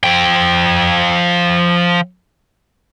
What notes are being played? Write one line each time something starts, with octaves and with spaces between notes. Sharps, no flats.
F3 G5